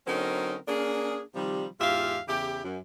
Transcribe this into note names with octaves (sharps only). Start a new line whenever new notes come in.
D3 F#3 C4 C#4 D#4 A#4
A#3 C#4 D4 G#4
C3 D#3 F3 G3
E2 G#2 F4 G4 E5 F5
E2 C#3 E4 G4
F#2